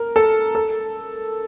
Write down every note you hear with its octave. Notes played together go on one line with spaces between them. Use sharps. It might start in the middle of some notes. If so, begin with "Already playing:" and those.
Already playing: A#4
A4
A4